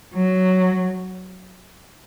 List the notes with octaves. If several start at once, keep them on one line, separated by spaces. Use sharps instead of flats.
F#3